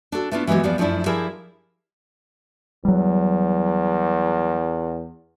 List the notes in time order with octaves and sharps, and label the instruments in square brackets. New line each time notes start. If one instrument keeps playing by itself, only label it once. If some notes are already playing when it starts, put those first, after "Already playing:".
[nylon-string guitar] D4 F#4 A4
A3 B3 D4 E4 F4
E3 F#3 G#3 B3 G4
E2 F3 B3 G4 D5
F#2 F3 A3 D4 E4
F3 E4 G4 G#4 A#4 E5
[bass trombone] E2 [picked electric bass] F#3 G3